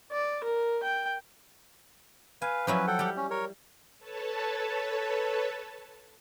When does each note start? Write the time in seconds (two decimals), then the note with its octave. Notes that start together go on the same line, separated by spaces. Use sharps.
0.12 D5
0.44 A#4
0.83 G5
2.42 B4 F5 G#5
2.67 F3 F#3 C#4 E4 B4
2.87 A4 F#5 G5
2.99 G3 G4
3.17 C#4
3.31 A#4 C#5
3.99 A4 B4 C#5 A5